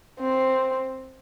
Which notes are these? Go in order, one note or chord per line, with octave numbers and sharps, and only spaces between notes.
C4